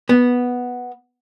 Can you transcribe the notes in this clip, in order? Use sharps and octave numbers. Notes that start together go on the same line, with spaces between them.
B3